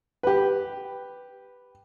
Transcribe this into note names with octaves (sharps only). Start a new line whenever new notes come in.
G4 B4